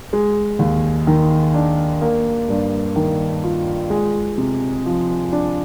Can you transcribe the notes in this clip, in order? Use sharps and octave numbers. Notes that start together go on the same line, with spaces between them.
G#3
D#2
D#3
D4
A#3
G2
D#3
F4
G#3
C3
F3
D4